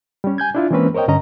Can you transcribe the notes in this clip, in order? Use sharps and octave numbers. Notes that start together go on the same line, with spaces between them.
G3 C#4
G#5 G6 G#6
D4 E4 F4
E3 G#3 A#3 C4 C#4 B4
A#4 C5 C#5 D#5 G5
G2 D3 C#4 D#5 A#5